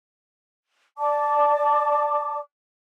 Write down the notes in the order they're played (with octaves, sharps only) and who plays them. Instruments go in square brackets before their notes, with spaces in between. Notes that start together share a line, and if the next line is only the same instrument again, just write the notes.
[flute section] D5 A5 D6